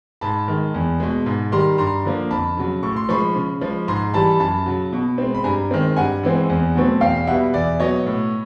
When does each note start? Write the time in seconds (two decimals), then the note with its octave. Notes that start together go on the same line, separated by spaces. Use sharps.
0.21 G#2 A5 B5
0.48 D#3 G#3
0.74 E2
1.00 B2 G#3
1.26 G#2
1.52 D#3 G3 A#5 C6
1.78 G2 A#5 C6
2.05 D3 F3 A#3
2.31 F2 A5 B5
2.57 C#3 F#3
2.83 A2 C#6
2.96 C6
3.09 F3 G#3 B5 C#6
3.35 C#3
3.61 F3 G#3
3.88 G#2 A#5 C6
4.14 E3 G3 A5 B5
4.40 F#2 A5 B5
4.66 C#3 F#3
4.93 B2
5.18 G#3 C4
5.34 B5
5.44 G2 G#5 A#5
5.71 D#3 G#3 C4
5.96 G2 F#5 G#5
6.23 E3 G#3 C4
6.50 E2
6.75 B2 F#3 A3 C4
7.01 E2 F5 G5
7.27 B2 G3 B3 E5 F#5
7.53 E2 D5 E5
7.79 B2 F#3 B3 C#5 D#5
8.06 A2